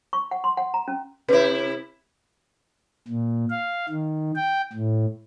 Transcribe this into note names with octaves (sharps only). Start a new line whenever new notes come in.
C#6
F#5
C6
F#5
A#5
C#4
C3 E4 B4 C#5
A#2
F5
D#3
G5
A2